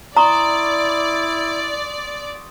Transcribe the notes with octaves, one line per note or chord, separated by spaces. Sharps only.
E4 D5 A#5 C6 C#6 D#6